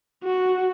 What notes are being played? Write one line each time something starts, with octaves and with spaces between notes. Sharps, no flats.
F#4